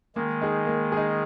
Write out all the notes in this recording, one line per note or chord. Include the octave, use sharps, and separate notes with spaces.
D#3 G#3 A#3
D#4 G#4
A#3
D#4 G#4